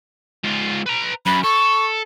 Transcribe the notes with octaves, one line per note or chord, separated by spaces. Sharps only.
G#2 F4
B4 A#5
F#2 B5
A4 C#6